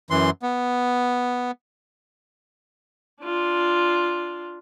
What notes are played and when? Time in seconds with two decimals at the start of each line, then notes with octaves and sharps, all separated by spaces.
0.10 F#2 E3 C6
0.43 B3
3.23 D4 F4